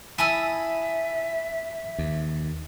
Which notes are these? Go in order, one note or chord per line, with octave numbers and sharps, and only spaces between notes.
E4 E5 G#5 A5 B5 D#6 E6
D#2